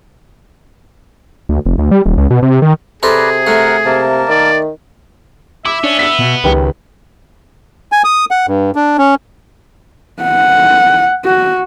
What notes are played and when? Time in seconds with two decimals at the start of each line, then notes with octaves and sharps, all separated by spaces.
1.49 D2
1.65 F1
1.78 D2
1.91 G3
2.06 D#1
2.17 C#2
2.30 B2
2.42 C3
2.62 D#3
3.03 C3 G#4 A4 B4 C5 D5 A#5
3.47 A3 A#4 F#5
3.85 C3 A#3 A#4 A5
4.29 D#3 D5
5.65 E4 E5 D6
5.84 C#4 D4
5.99 B3 E6 B6
6.19 B2
6.44 C#2 D#3 G4 B4
7.92 G#5
8.04 D#6
8.31 F#5
8.47 G2
8.75 D4
8.98 C#4
10.22 F#5
11.25 F#4